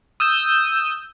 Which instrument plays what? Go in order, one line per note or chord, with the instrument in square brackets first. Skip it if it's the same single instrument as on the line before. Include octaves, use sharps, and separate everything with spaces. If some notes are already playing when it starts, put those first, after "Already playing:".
[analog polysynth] D#6 E6 G6